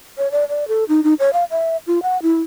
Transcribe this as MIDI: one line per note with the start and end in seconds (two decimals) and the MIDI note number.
0.18 0.31 73
0.32 0.45 74
0.49 0.68 74
0.68 0.84 69
0.89 1.03 63
1.04 1.14 63
1.19 1.30 73
1.33 1.44 77
1.51 1.77 76
1.87 2.02 65
2.03 2.21 78
2.22 2.41 64